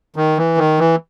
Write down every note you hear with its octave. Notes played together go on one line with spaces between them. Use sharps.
D#3
E3
D#3
E3